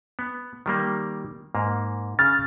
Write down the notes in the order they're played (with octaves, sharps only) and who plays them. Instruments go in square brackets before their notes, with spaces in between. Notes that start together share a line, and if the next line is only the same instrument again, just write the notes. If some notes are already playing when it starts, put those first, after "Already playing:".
[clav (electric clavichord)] B3
D#3 G3 A#3
G#2 A#3
[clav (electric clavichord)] C#3 [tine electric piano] F6 A6